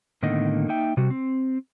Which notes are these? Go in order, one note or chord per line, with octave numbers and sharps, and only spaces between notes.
A2 D3 D#3 A#3 B3 D#5
A#3 D#4 E5 G5
C3 G3 F#4
C4